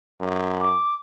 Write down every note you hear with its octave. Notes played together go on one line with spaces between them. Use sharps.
F#2
D6